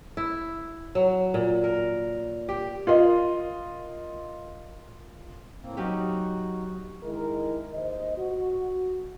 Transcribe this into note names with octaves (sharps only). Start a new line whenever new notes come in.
E4
F#3
A#2
A#4
G4
F4 A#4 D#5
A2 A#3 C4
F#3 C#4 D#4 F#4 G4
D#3 G#3 E4 A#4
D#2 C5 D#5
F#4